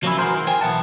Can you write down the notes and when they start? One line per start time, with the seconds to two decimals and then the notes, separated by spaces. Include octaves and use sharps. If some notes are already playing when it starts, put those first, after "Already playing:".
0.03 F3 F#3 A#3 C4 C#4 E4
0.19 C2 E3 F#4 G#4 A#4 C5
0.34 D#3 E3
0.47 A#4 C5 G5 G#5
0.61 B1 E3 B3 E5 F#5 A5